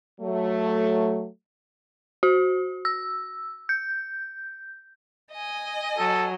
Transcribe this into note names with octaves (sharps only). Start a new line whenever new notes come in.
F#3 A3
F#4
E6
G6
D#5 G#5
F#3 A4